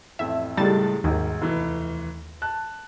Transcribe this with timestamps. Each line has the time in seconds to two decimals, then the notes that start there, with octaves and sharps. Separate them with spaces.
0.19 A1 F2 E5
0.57 C#2 A2 G3 G#3 A5 A6
1.04 G#1 D#2 G#2
1.42 F1 E3
2.42 A5 F#6